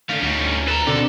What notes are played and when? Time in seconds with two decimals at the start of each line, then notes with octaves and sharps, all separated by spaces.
0.10 D3 A3 C#4 F5
0.22 D2 G3 C#4 D#4 F#4
0.67 A4 B4 A#5
0.87 B2 D3 C4 A#4